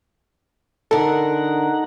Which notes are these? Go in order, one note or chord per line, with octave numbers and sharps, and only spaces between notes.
D3 D#4 A4 A#4 F#5 A#5